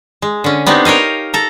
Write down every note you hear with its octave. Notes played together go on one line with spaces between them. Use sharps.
G#3
D3 C#4
B3 C4 D4 D#4 G4
A#4 C#5 D#5 F5
A4 A#5